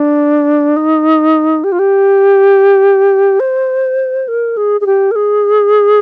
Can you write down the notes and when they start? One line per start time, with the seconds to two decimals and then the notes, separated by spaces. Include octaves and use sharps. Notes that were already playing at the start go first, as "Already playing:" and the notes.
Already playing: D4
0.76 D#4
1.64 G4
1.72 F4
1.79 G4
3.40 C5
4.28 A#4
4.57 G#4
4.81 G#4
4.86 G4
5.11 A#4
5.16 G#4